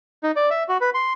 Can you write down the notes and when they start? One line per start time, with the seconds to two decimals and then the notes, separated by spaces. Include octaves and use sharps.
0.23 D#4
0.36 D5
0.50 E5
0.69 F#4
0.81 B4
0.94 C6